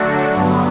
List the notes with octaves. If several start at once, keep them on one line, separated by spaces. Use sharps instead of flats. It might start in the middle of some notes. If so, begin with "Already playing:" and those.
Already playing: D3 F#3 A3 D4 F#4
G2 D3 F#3 B3